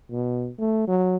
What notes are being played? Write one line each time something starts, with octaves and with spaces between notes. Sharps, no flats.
B2
A3
F#3